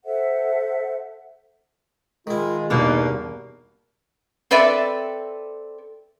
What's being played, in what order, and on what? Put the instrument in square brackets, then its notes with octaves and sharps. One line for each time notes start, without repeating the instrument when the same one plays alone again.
[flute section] A4 C5 E5 F#5
[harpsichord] D#3 E4 [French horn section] G#3 [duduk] F4
[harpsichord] E2 G2 [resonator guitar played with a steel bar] B2 A#3 [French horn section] D#4 [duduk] A#4
[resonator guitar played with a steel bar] C4 A4 B4 D5 E5